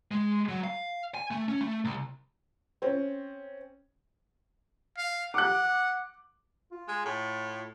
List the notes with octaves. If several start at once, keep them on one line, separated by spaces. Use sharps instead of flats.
G#3
F#3
F5
G#5
A3
C#4
A3
C2
C4 C#4
F5
F#5 D6 F#6
F4
G#3
A2